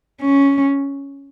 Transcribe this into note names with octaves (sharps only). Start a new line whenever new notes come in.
C#4